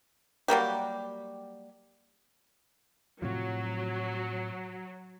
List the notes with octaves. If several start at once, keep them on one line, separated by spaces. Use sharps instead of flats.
F#3 G3 A#3 G4
A2 C3 F3 F#3